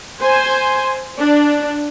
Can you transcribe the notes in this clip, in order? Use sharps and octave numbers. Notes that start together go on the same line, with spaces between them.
C5 G#5
D4